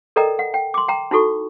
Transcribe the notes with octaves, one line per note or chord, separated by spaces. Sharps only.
A4 A#4 D5 D#5 G5 A#5
F#5
G5
C6 D6
G5 A#5
D#4 E4 F#4 A4 C#6